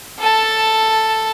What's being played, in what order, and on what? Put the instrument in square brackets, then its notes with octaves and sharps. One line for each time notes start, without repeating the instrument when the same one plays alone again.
[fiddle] A4 A5